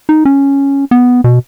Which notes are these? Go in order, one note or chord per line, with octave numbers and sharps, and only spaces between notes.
D#4
C#4
B3
B2